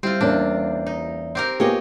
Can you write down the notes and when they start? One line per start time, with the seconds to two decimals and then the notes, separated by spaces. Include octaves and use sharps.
0.03 G3 C4 E4 F4
0.21 E2 A#3 C#4 D4
0.87 D#4
1.35 C4 G4 A#4
1.60 A#3 B3 F4 G4 G#4 C#5 D#5